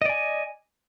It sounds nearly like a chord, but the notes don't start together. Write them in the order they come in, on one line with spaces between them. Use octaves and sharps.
D#5 D5 G#5